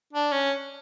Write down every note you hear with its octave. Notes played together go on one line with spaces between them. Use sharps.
D4
C#4